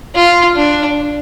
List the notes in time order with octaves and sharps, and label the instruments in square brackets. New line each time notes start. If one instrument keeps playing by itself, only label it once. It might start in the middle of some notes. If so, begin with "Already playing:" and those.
[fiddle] F4
D4